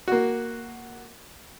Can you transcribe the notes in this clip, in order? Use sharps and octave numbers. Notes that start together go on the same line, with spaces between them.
A#3 F#4